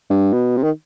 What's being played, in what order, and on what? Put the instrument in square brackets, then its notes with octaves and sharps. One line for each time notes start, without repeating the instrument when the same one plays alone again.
[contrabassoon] G2
B2
C3
D#3